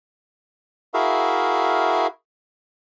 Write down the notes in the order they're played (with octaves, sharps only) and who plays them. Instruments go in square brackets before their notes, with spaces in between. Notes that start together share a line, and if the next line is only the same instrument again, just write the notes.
[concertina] E4 F#4 G#4 A#4 E5 F5